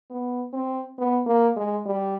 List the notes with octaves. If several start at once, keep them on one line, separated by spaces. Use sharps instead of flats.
B3
C4
B3
A#3
G#3
G3